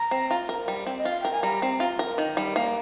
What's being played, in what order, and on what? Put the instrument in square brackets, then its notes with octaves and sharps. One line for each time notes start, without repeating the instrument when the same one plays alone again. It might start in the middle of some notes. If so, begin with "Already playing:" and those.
Already playing: [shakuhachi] A#5
[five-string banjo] C4
F4
A#4
G3
C4
[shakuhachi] D#5
[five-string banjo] F4 [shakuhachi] F5
[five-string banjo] A#4 [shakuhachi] G5
[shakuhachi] G#5
[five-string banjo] G3 [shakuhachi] A#5
[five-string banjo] C4
F4
A#4
D#3
G3
A#3